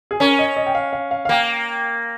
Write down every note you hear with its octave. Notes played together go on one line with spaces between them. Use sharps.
G#4
C#4 A#4
D#5
D#5
G5
F5
F5
F5
F5
A#3 G5